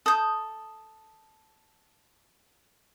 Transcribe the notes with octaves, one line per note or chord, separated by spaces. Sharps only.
A4 D#6 G6